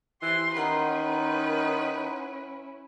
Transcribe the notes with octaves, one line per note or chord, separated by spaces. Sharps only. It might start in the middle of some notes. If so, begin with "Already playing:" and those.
E3 G4 C5 C6
D#3 C#4 E4 B4 F#5 A#5 C6